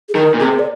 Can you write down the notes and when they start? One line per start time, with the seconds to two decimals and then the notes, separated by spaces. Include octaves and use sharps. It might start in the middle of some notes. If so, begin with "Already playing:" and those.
0.09 G#4
0.15 D#3 A#4
0.34 A#2
0.40 C3 G#4
0.59 D5